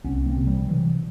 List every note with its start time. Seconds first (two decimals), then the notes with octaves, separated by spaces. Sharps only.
0.04 C2 B3 C#4
0.26 A#3 C4
0.37 C3
0.47 F3 G3
0.68 C3 E3 F#3